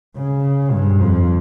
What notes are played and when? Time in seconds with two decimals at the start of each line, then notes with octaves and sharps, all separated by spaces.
0.16 C#3
0.72 G2
1.00 F2